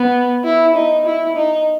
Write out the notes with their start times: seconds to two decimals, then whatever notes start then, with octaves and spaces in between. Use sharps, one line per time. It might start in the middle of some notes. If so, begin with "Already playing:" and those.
Already playing: B3
0.44 E4
0.75 D#4
1.06 E4
1.36 D#4